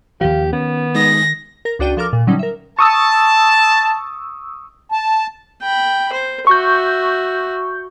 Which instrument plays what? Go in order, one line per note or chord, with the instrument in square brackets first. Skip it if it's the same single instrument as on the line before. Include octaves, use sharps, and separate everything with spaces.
[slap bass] D#2 D#3 F3 [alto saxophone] G4 [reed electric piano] F5
[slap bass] D#3 [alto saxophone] B3 [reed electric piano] C#4
[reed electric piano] G#3 D#4 D#6 [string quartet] A#6
[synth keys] A#4 A#6
C#2 D4 F#4 D5 G5 D#7
F3 A4 A#4 D6 F6
A#2
D3 F#3 G3 C#4 D#4
A#4 E5
[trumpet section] A5 [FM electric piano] C#6 D#6 E6
[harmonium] A5
[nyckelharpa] G5 B5
C5
[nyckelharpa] F#4 E5 [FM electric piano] C#6 G6